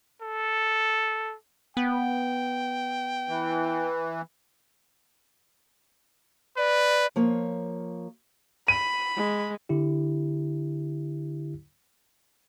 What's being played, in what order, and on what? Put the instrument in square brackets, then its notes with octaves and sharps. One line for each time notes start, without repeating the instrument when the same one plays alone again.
[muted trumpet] A4
[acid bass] B3 [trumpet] G5
[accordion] E3
[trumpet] B4 [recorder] D5
[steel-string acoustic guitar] F3 A#3 C#5
[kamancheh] B5 [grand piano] D#7
[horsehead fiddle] G#3
[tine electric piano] D3 E4 G4